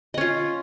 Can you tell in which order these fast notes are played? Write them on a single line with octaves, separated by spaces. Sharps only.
D#5 C#4 F4